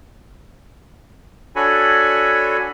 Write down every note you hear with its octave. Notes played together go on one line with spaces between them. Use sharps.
D4 F#4 A4 C#5 G#5 B5